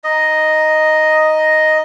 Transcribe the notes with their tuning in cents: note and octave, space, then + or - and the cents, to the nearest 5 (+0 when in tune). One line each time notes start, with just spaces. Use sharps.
D#4 +0 D#5 +0